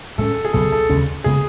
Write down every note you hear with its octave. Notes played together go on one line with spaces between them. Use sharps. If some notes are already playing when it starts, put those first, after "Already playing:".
A2 G#3 C#4 A4
G#4
C#2 B2 F#3 B3 A4
A4
D#2 C#3 G#3 C#4
C#3 G#3 B3 G#4